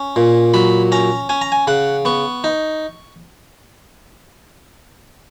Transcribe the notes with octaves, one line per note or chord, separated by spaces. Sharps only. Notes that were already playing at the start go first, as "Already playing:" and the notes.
Already playing: C#4
A#2
F#3 B5
C#4 A#5
C#4 G#5
A#5
G#5
C#3 F#5
B3 C#6
D#4